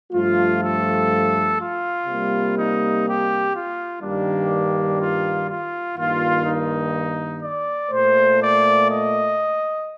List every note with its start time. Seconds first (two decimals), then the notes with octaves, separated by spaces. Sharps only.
0.12 G2 F3 A3 F4
0.61 A4
1.58 F4
2.07 C3 G3 A#3
2.56 D#4
3.05 G4
3.53 F4
4.01 G2 D#3 G3 A#3 D4
4.99 F4
5.47 F4
5.96 G2 D#3 A#3 F4
6.45 D#4
7.42 D5
7.91 A#2 A3 C5
8.39 D5
8.88 D#5